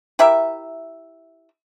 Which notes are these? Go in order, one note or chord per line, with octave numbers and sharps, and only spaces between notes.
E4 G4 A#4 E5